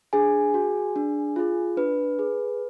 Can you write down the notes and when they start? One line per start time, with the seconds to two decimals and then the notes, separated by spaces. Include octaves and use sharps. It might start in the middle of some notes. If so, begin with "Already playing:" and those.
0.13 D4 G#4 G#5
0.54 F#4
0.96 D4
1.36 F4 G#4
1.77 D4 B4
2.19 G#4